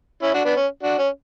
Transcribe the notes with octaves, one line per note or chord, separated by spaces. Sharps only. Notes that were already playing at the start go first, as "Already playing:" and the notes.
C#4 E4
D4 F#4
B3 D4
C#4
D4 F#4
C#4